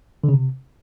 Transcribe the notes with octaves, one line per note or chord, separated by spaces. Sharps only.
D3
C#3
C3